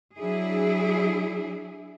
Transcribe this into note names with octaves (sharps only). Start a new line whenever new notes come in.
F#3 D4 E4 G#4